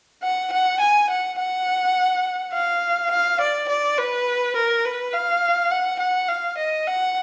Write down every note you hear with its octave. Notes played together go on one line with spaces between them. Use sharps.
F#5
F#5
G#5
F#5
F#5
F5
F5
D5
D5
B4
A#4
B4
F5
F#5
F#5
F5
D#5
F#5